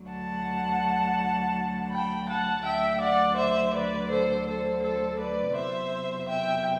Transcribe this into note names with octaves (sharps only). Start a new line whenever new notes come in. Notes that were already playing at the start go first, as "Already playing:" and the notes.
Already playing: D2 D3 F#3
F#5 A5
G5 B5
F#5 A5
D2 D3 F#3 E5 G5
D5 F#5
C5 E5
B4 D5
A4 C5
A4 C5
A4 C5
B4 D5
E2 C3 F#3 C5 E5
E5 G5